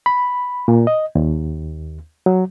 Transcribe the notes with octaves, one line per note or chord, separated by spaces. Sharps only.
B5
A#2
D#5
D#2
F#3